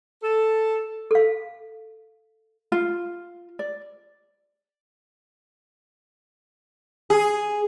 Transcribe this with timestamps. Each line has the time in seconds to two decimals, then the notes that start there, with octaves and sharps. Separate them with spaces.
0.23 A4
1.11 A4 F5
2.72 F4
3.59 D5
7.10 G#4